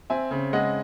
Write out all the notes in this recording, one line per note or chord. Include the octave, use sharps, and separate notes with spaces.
C4 E5 G#5
C#3
G#3 D#5 F#5